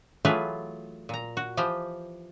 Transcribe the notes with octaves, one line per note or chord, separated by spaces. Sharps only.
E3 F#3 A3 F4 G#4 B4
A#2 A#5
F#4
E3 F3 G4 C5